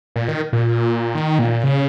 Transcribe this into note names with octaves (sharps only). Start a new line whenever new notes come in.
A#2
D#3
A#2
D#3
A#2
C#3